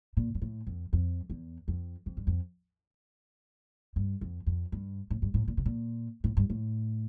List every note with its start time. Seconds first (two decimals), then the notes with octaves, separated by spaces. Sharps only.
0.17 A#2
0.35 G2
0.42 A2
0.67 F2
0.93 F2
1.30 E2
1.68 F2
2.06 F2
2.17 G2
2.27 F2
3.96 G2
4.21 F2
4.46 F2
4.72 G2
5.11 A2
5.22 G2
5.34 A2
5.48 A#2
5.57 C3
5.66 A#2
6.24 A2
6.37 G2
6.50 A2